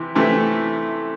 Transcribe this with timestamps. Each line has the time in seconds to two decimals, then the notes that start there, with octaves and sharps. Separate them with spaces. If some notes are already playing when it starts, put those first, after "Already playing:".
Already playing: C3 E3
0.15 C3 E3 A3